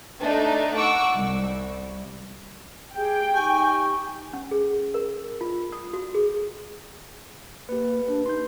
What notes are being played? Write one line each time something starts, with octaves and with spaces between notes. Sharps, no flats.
A3 D4 D#4
F#5 C#6 D6 E6
C2
G4 G#4 G5
D#4 G4 G#5 C#6
C#4
G#4
A#4
F4
D#6
F#4
G#4
A#3 G4 B4
D4 B4
D#4 C6 G6